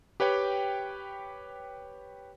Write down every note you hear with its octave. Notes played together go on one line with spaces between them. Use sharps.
G4 B4 C#5 G5